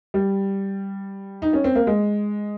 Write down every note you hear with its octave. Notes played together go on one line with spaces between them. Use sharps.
G3
D#4
C#4
C4
A#3
G#3